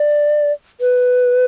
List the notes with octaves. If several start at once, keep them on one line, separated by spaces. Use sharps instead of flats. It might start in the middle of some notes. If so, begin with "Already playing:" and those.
Already playing: D5
B4